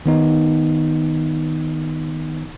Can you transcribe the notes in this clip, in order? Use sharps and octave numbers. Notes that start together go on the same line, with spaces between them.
D#3 B3 D#4